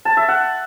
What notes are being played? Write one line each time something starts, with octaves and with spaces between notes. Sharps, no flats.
A5
E5
F#5